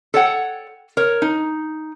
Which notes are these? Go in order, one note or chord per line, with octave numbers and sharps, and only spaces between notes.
A4 C#5 F#5 G5
A#4 C#5
D#4